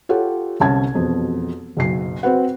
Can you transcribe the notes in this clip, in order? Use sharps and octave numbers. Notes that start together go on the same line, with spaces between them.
F4 G4 A4 C#5 F#5
G1 C2 C#4 A5 G#6
E1 F2 B2
F#1 B1 C7
C4 F#4 B4 F#5